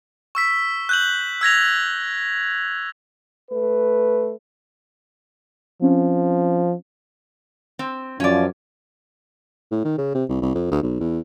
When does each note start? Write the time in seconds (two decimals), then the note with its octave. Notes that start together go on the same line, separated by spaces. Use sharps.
0.35 C#6 E6 B6
0.89 F#6 G6 F#7
1.41 E6 G#6 A#6 F7
3.50 A3 B4
5.82 F3 C4 C#4
7.79 C4
8.20 F#2 F3 C#4 D5
9.71 A2
9.85 D#3
9.98 C#3
10.15 C3
10.29 C2
10.42 C2
10.55 F2
10.71 D2
10.83 B1
11.00 E2